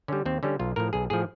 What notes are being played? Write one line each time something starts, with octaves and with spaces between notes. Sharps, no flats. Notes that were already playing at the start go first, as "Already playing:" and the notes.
D3 G3 C#4
D#2 C4
D3 G3 C#4
B1 F4
A2 F3 A#4
B1 G#4
A2 F3 G#4